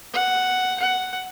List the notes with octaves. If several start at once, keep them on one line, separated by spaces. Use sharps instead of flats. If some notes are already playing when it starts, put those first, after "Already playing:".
F#5
F#5